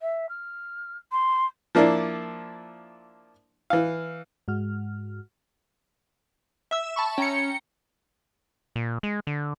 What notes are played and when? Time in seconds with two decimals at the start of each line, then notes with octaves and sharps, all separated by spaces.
0.02 E5
0.29 F6
1.12 C6
1.75 F3 A#3 D4 E4
3.70 E3 F5
4.48 G#2 G#3 F#4 F6
6.71 E5 E6
6.96 A5 B5 C#6
7.18 C#4 G5 A#5 C#7
8.76 A#2
9.03 G#3
9.27 D3